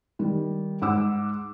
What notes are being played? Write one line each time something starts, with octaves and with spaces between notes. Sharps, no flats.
D#3 G3
G#2 F#5 D6 E6